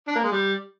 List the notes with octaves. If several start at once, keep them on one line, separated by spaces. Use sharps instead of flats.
D4
A#3
G#3
G3